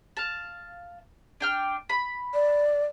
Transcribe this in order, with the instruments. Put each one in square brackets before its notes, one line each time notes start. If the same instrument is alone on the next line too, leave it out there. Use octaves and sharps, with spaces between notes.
[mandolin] F5 A5
D4 G5 F6
B5
[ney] D5